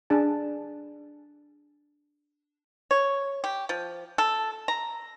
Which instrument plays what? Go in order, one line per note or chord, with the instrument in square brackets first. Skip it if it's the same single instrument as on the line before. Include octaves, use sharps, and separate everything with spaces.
[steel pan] D4 G#4 A5
[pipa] C#5
G4
F3
A4
A#5